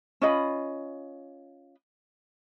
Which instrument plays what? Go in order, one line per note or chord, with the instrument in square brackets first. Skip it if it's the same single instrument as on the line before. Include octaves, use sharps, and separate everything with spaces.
[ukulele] C#4 F4 D#5 B5